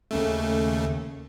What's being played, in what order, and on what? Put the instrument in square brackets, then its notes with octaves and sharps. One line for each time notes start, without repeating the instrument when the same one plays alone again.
[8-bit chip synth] D#2 C#3 A3